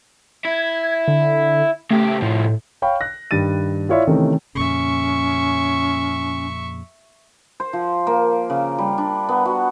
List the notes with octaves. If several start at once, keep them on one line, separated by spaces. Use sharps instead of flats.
E4 G#6
D3
C#3 A3 G4
C2 A2 F3
C#5 F5 G5 B5 C#6
F#6 A#6
G2 D#3 A6 D#7
E4 F4 C#5 D5 E5
C3 D#3 E3 A3 C#4
F2 A#2 C#3 C#4 E5 C#6
C5
F3
A#3
C#3
G3
D4
B3
F#4